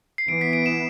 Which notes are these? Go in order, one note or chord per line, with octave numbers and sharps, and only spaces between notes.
C7
E3 B3 D7
B6
D7
E7